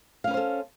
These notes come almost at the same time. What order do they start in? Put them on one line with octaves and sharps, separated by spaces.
F5 C#4 B4 C5 A4